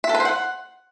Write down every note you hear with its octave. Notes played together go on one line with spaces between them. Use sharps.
E5
A4
B4
C5
F#5